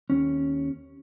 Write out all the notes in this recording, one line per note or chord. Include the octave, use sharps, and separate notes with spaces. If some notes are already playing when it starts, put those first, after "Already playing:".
D#2 C#4